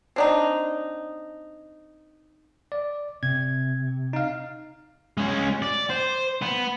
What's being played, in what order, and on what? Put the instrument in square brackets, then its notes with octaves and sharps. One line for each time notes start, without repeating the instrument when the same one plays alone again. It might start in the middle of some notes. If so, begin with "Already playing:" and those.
[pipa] C4 D4 D#4
[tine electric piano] D5
[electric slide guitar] C3 [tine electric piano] G#6
[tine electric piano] D#4 F5
[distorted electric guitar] G#3 C#4
D5
C5
B3